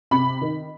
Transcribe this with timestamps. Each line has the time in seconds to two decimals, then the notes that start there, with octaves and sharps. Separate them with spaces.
0.11 C3 B5
0.41 D#3